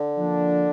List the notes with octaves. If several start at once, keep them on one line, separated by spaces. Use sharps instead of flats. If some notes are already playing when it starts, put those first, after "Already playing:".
Already playing: D3
F3 A#3 D4